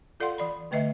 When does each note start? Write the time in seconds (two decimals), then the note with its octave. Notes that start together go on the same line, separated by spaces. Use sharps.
0.20 F4 A4 D5 F5 F#5 C6
0.38 E3 D5 B5
0.71 D3 A3 B4 D#5 E5